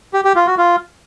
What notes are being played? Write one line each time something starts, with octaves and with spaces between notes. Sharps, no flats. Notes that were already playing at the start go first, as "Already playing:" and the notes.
G4
G4
F4
F#4
F4